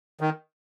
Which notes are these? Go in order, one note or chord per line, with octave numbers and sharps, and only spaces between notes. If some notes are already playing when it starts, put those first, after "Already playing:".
D#3